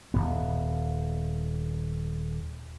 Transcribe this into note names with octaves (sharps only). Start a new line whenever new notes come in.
D#1 F#2 B3